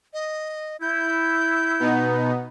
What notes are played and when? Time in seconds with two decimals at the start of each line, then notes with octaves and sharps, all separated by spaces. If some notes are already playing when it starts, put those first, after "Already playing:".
0.14 D#5
0.82 E4 G6
1.80 B2 B3 D#4